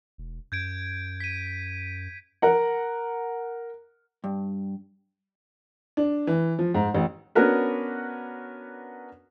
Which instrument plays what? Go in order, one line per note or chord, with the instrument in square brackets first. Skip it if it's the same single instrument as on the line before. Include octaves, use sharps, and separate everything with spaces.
[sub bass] E1
[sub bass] F#2 [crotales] G6 G#6 D7
[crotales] B6 D#7
[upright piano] A#4 F#5
[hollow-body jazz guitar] G2
[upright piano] D4
E3
F3
G#2
A1
[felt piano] B3 C#4 D4 F#4 A#4 B4